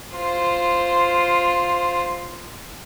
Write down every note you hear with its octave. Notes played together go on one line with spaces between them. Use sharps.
F4 C5